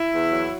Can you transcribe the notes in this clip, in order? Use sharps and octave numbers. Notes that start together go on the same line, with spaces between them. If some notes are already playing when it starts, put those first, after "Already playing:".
Already playing: E4
E2
F#3